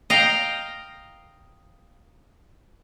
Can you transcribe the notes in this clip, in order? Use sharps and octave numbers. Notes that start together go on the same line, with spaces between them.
D#5 F5 G5 A#5